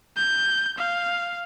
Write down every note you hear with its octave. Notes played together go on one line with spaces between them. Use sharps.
G6
F5